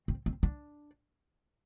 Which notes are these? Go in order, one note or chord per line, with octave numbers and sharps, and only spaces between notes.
C4
C4
D4